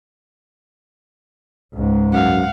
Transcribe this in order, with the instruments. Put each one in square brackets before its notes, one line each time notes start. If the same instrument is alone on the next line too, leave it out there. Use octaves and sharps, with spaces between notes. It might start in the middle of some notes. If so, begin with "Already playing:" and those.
[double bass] C#2 G#2
[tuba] F#2 [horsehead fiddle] F5 F#5